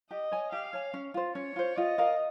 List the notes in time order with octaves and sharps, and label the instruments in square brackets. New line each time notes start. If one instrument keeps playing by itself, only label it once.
[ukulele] G4 [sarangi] D#5
[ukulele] C#5 G#5
[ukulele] G4 [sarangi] F5
[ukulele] C#5 G#5
C#4
F4 C5
[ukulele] C#4 [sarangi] C#5
[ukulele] F4 C5
[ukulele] F4 [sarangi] D#5
[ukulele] A#4 F5